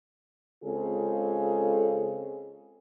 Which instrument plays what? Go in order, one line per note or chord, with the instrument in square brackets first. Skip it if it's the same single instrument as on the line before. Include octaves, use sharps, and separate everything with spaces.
[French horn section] C#3 G#3 C4 F4 G#4 A4